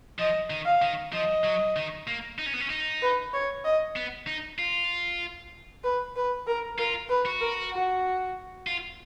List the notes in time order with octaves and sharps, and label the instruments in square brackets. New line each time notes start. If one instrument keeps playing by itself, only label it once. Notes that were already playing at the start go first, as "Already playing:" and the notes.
[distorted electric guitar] F3 [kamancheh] D#5
[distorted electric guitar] D#3
[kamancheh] F5
[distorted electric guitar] D#3
[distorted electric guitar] F3 [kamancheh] D#5
[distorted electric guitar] F#3
D#3
A#3
D#4
C#4
B3
C#4
D#4
[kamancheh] B4
C#5
D#5
[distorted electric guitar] B3
D#4
F4
[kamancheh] B4
B4
A#4
[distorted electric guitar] F4 [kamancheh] A#4
[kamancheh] B4
[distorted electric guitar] F#4
[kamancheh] A#4
F#4
[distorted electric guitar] F4